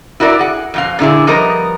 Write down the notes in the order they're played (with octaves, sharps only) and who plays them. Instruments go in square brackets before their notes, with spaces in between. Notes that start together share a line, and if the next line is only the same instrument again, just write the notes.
[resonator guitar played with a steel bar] E4 F#4 A#4 D5
G#4 F#5
F2 B2 F5
A#2 D3 E4 G#4
F3 G3 B3 A#4 D#5